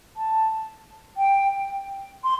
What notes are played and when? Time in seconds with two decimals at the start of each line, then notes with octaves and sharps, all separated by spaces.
0.17 A5
1.17 G5
2.24 C6